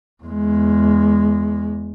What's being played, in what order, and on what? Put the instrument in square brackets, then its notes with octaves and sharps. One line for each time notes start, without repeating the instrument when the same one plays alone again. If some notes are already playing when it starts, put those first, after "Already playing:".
[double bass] E2 G#3